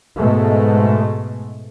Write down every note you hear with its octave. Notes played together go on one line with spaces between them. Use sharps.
G#2 B2 G#3 A3